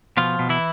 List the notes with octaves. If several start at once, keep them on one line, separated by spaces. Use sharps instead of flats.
B2 F3 F4
B2
E3 E4